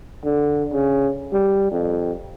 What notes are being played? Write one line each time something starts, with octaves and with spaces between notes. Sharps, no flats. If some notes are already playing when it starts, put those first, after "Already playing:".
D3
C#3
G3
F2